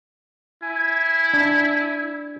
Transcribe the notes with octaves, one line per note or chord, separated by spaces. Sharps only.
E4 G#5
D4